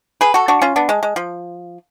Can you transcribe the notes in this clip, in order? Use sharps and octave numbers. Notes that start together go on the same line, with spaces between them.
G#4 B4
F#4 A4
D4 F#4
C#4 F4
B3 D4
G#3
G#3
F3